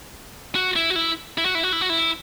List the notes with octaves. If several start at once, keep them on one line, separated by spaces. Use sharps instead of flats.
F#4
E4
F#4
E4
E4
F#4
E4
F#4
E4
F#4
E4